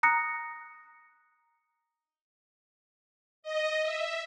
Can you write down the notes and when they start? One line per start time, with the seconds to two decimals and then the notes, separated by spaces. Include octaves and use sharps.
0.03 A#5 D#6 F#6 A#6 C#7
3.42 D#5
3.82 E5